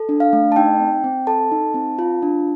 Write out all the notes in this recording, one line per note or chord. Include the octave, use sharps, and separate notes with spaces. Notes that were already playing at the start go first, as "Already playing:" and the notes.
Already playing: A4
D4
F5
A3
A5
D#4 G5
C4
C4
A4 A5
D#4
C4
F4
D4